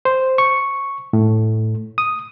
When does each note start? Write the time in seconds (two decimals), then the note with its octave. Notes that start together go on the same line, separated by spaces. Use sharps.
0.05 C5
0.38 C#6
1.13 A2
1.98 D#6